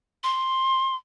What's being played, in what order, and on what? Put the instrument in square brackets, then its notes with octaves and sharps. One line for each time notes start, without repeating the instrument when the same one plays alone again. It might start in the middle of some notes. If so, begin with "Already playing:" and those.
[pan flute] C6